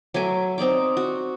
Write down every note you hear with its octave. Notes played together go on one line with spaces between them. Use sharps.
F#3 A3 G#5 D6
C4 D#4 D5 D6
F#4